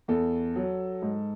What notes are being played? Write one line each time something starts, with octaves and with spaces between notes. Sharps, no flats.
E2 A4
F#3
G#2